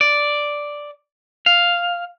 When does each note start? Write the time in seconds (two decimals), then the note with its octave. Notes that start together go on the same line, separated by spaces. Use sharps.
0.01 D5
1.46 F5